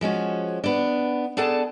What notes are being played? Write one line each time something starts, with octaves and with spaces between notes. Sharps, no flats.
F3 G#3 C#4 F#4
B3 D4
B3 D4 G#4 A4 D5 A5